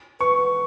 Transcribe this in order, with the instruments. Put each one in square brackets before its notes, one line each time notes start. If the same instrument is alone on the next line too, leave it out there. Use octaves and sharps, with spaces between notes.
[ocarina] B4 [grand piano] C#6